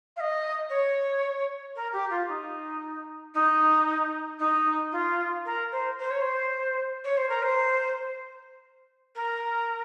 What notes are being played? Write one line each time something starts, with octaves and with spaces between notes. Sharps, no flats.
F5
D#5
C#5
A#4
G4
F4
D#4
D#4
D#4
F4
A#4
C5
C5
C#5
C5
C#5
C5
A#4
C5
A#4